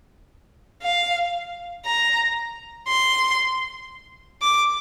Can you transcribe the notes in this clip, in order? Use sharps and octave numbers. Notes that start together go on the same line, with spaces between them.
F5
A#5
C6
D6